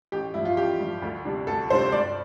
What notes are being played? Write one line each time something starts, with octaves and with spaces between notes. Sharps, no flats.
A1 G4
G2 F3 E4
F4
A1 G4
G2 F3
D2
C3 G3 D4
D2 A4
C3 G3 D4 C5
G2 D5